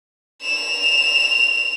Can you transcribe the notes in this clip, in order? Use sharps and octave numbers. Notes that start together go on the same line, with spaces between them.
E7 F7